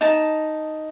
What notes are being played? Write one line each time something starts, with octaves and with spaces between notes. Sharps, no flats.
D#4 A5